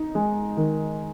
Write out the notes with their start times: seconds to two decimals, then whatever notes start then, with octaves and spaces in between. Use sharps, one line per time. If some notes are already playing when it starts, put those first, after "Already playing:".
Already playing: D#4
0.15 G#3
0.57 D#3